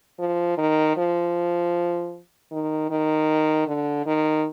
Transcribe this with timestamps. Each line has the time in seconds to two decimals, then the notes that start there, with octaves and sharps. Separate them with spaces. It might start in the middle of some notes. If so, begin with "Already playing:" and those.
0.19 F3
0.57 D#3
0.97 F3
2.51 D#3
2.90 D#3
3.67 D3
4.06 D#3